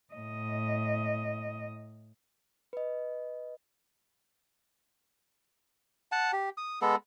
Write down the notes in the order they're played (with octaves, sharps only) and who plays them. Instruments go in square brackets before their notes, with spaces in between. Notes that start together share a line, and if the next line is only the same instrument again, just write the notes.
[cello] A2 D#5
[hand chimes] B4 D#5
[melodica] F#5 A5
G4
D#6
G#3 B3 A4